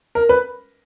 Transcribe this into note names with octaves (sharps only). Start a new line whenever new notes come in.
A#4
B4